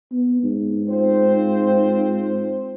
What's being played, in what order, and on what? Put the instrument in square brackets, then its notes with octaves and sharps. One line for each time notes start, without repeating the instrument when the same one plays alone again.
[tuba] B3
G#2
[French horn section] C4 F4 C5